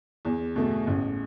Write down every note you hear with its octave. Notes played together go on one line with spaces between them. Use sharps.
E2
B2 A3
A1